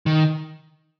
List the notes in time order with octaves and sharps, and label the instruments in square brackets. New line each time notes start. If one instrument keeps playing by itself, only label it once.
[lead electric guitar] D#3